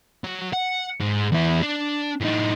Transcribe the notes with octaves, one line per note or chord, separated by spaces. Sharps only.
F#3
F#5
G#2
E2 E4
D4
A2 D#4